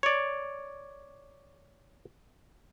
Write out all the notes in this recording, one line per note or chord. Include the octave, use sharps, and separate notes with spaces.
C#5 D5